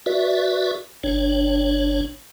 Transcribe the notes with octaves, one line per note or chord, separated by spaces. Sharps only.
F#4 B4 D5 E5
G1 D4 C#5